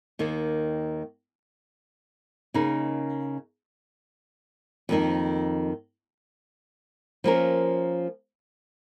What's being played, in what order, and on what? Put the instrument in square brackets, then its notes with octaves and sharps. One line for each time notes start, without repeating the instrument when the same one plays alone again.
[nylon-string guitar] D#2 D#3 A#3
C#3 A#3 D#4
F2 D#3 A#3 D#4
F3 A#3 C#4 A#4